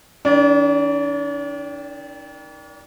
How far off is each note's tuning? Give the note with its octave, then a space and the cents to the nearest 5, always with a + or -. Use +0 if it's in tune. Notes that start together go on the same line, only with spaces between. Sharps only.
D#3 +20 D4 -45 D5 +0